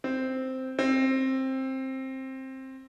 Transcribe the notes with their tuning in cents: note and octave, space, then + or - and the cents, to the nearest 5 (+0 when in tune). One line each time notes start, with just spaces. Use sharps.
C4 -5
C4 +15